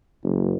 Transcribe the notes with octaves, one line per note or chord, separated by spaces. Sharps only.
F#1